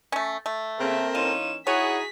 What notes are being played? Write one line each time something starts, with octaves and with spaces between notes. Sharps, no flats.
A3 C#4
A3
C#3 A#3 C4 A4 A#4 E5
E3 C#4 D#4 F4 E7
D#4 E4 F#4 G#4 C#5 F#5 B6